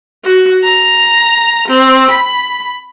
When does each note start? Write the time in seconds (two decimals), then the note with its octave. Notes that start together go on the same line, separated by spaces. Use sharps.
0.25 F#4
0.63 A#5
1.68 C4
2.10 B5